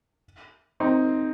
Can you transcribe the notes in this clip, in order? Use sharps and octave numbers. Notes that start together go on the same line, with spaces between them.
C4 D#4